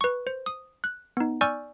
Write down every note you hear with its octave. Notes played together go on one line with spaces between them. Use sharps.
B4 C#6
C5
D#6
F#6
B3 D#4
D5 G#5 C#6 E6 F6 G6